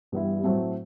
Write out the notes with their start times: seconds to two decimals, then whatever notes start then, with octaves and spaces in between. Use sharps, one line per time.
0.12 G2 E3 G3 B3 E4
0.43 A2 F#3 A3 C4